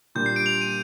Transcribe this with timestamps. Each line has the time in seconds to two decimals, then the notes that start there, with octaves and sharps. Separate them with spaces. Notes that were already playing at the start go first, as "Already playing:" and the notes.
0.15 A#2 G3 D4 G6
0.26 C7
0.36 D7
0.46 F7
0.61 D#7